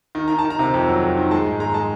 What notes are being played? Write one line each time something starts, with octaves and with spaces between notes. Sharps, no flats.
D#3
D#3 A#5
A5
D#3
A#5
C3
F2
F#3
F2
D#3
G#3 A5
G#2
G#3 A#5
G#3 A5